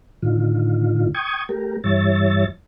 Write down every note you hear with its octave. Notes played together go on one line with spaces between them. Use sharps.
A2 D3 D#3 F4
G5 C#6 D#6 G#6
A3 G4 A#4
G2 E3 G3 C#5 E5 A6